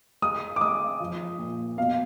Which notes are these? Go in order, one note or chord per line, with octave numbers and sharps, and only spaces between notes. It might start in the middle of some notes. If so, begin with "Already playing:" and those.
G#3 D#6
D6
G#3 D#6
F3
A#2
B2 F5